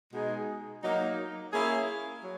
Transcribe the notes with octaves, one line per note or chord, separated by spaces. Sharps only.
B2 G#3 D#4 G#4
F#3 A#3 D#4
A#3 C#4 E4 G#4
F#3